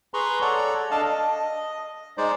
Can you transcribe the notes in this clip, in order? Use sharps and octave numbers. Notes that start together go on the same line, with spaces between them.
G#4 B4 A#5 C6 C#6
A4 C#5 D5 F#5 A#5
D4 A4 D#5 F5 A5
D#5
G#3 D#4 C5 D5